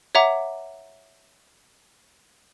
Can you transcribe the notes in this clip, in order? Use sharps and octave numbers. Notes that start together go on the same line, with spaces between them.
C#5 E5 F#5 A#5 D6